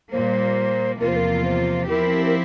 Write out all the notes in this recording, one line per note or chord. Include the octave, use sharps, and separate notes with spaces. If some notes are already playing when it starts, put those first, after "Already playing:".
A#2 G3 A#3 C5
E2 C3 F3 A#3 F4 A#4
C5
A#4
C5
F3 C4 E4 G4 A#4
A#4